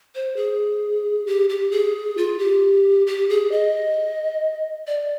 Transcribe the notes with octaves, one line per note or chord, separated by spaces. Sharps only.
C5
G#4
G4
G4
G#4
F4
G4
G4
G#4
D#5
D5